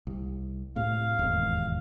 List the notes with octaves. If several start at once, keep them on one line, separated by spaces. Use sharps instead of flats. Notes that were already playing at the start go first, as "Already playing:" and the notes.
C2
A2 C3 F5
E1 D#2 G#2